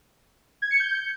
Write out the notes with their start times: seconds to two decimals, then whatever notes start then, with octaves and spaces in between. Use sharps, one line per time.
0.62 G#6
0.71 C#7
0.80 G6